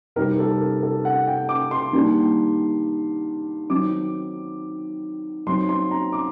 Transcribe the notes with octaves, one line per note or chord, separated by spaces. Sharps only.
C3 G3 C4 D#4 A#4
A4
A#4
A4
F#5
G5
D6
C6
D#3 G3 A#3 D4
D#3 F#3 C4 D#4 D6
F#3 C4 D#4 C6
C6
A#5
D6